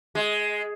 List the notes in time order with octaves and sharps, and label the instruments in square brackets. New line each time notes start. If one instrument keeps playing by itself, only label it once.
[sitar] G#3